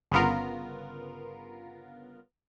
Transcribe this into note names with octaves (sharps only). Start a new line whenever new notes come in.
G1 C#3 B3 F4 A#4